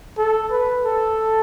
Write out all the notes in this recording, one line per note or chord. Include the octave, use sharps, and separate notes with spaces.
A4
B4
A4